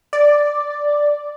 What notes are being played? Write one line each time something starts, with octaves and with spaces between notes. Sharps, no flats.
D5